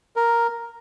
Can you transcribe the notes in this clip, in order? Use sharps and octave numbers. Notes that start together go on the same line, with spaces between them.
A#4